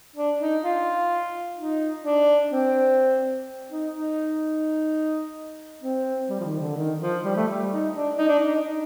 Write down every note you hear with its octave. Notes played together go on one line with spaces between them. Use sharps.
D4
D#4
F4
D#4
D4
C4
D#4
D#4
C4
G3
F3
D#3
D3
D#3
F3
G3
A3
G3
D#4
D4
D#4
D4
D#4
D#4